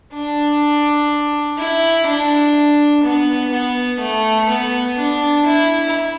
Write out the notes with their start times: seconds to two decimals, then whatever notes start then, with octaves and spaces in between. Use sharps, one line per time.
0.12 D4
1.58 E4
2.06 D4
3.03 B3
3.51 B3
3.99 A3
4.49 B3
4.97 D4
5.46 E4